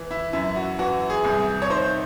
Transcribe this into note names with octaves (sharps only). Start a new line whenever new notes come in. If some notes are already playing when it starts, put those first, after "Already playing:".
Already playing: E3
E4
F#2 E4
F#4
E3 F#4
G#4
C2
C#5
D#3 C5